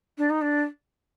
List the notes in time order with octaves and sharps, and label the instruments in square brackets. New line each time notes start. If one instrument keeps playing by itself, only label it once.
[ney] D4
D#4
D4